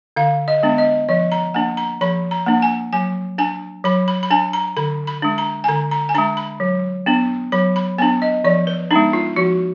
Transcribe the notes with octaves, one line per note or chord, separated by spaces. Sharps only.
D3 F5
D#5
G#3 B3 D4
D#5
F3 D#5
A#5
A#3 D4 G#5
A#5
F3 B5
A#5
A#3 D4
G#5
F#3 G#5
D4 G#5
F#3 B5
B5
B5
D4 G#5
A#5
D3 B5
B5
G#3 D4
A#5
G#5
D3 A#5
A#5
G#5
G#3 D4 A#5
B5
F#3
B3 D4
F#3 B5
B5
B3 D4 G#5
D#5
F3 D5
B4
G#3 B3 D4 D#4
F4
F3 F#4